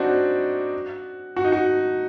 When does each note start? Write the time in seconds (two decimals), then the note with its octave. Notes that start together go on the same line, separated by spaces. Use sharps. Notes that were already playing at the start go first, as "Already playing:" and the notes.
Already playing: C4 D4 D#4 F#4
1.36 F#4
1.44 D#4
1.52 F#4